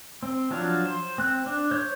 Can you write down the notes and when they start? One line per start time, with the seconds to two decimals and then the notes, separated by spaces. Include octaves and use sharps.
0.23 C4
0.51 F3 F#3 D4 F5
0.85 C5
1.18 C4 F#6
1.46 D4
1.71 C5 C#5 G6